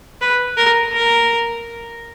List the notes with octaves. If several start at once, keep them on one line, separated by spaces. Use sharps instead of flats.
B4
A#4
A#4